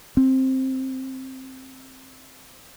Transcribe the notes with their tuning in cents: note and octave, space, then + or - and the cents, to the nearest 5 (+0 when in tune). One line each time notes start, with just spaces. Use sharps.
C4 +10